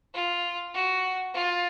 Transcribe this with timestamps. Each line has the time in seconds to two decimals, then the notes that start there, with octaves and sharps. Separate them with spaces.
0.14 F4
0.74 F#4
1.34 F4